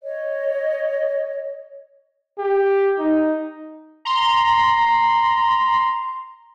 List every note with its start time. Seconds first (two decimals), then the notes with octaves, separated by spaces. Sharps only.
0.02 C#5 D#5
2.38 G4
2.98 D#4
4.05 A#5 C6